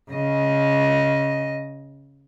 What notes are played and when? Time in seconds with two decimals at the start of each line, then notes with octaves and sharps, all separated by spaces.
0.11 C#3 D#5